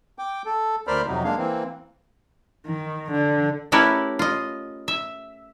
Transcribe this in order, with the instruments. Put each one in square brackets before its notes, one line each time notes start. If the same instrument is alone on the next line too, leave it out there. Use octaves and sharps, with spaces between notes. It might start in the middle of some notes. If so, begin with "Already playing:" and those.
[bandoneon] G5 D6
A4
D2 A#4 C5 D5 B5 F6
F2 C3 F#3 D#4
G#3 A#3 D4 F5
E3 A#3 C4
[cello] D#3
D3
[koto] A3 C#4 E4 G4 A#4 B4
F4 D#5
E5